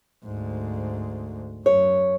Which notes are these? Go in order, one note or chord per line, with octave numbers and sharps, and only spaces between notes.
D2 G#2
F#2 C#5